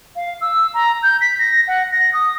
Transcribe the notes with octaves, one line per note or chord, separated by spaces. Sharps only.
F5
E6
A#5
G6
B6
A#6
F#5
A#6
D#6